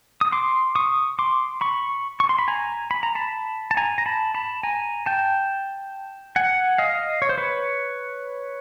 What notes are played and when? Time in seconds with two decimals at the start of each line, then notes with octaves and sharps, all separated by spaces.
0.21 D#6
0.32 C6 D6
0.75 C#6 D#6
1.19 C6 D6
1.61 B5 C#6
2.20 C#6
2.29 C6
2.39 B5
2.48 G#5 A#5
2.91 B5
3.03 A#5
3.15 A5 B5
3.71 A5
3.77 G#5 A#5
3.98 A#5
4.06 A5 B5
4.35 A5 B5
4.63 G#5 A#5
5.06 G5 A5
6.36 F#5 G#5
6.78 D#5 F5
7.22 C#5
7.29 C5
7.38 B4 C#5